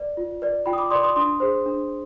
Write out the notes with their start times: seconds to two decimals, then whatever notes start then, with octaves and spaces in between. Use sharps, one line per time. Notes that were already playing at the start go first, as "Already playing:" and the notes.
Already playing: B4 D5
0.17 F4
0.42 B4 D5
0.66 F4 G5 B5
0.73 D#6
0.78 B5 D6
0.90 B4 D5 C6 D#6
1.03 C6 D#6
1.16 D4 C6 D#6
1.40 G#4 C5
1.66 D4